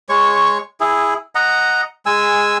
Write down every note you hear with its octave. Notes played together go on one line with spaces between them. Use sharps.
G#3 C#5 C#6
E4 G#4
D#5 F#5 A#5
G#3 G#5 E6